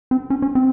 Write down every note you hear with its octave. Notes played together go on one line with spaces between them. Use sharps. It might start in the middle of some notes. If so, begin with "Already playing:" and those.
C4
C#4
C#4
C4